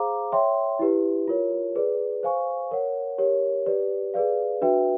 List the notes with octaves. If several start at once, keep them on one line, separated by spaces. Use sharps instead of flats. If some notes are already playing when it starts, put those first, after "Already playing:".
Already playing: G#4 C5 F5 A#5 D6
C#5 E5 G5 C6
E4 G4 B4
F4 A#4 C#5
G#4 B4 D5
C5 F5 G#5 C#6
A#4 C#5 F#5
G4 A#4 C#5
G4 B4 D5
G#4 B4 D5 F5
D4 F#4 B4 E5 G5